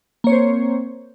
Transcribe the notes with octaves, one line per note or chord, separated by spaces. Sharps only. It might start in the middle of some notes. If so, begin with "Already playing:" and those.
A#3 C4 C5 C#5